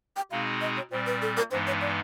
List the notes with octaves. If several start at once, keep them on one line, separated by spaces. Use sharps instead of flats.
G5
B2 G#3 C4 D#4 G#4 F5
D#5
C#5
A#2 G3 C4 C5
B4
A4
A#4
G2 E3 G#3 B3 D#4 C5
C#5
D5